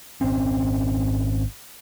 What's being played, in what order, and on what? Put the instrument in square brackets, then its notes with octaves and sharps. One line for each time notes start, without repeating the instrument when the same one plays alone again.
[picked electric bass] G#1 C4 C#4